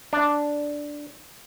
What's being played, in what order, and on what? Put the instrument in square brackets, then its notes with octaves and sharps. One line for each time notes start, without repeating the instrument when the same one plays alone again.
[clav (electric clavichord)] D4